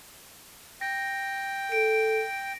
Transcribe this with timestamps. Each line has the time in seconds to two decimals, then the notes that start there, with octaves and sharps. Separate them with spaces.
0.81 G5 A#6
1.72 A4 D7